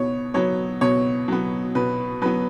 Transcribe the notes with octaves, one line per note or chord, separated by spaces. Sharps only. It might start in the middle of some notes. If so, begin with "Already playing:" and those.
Already playing: B2 B3 C#5
F#3 B3 C#5
B2 C#5
F#3 B3
B2 B4
F#3 B3 B4